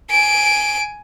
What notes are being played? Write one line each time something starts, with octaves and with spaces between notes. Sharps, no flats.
G#5 D7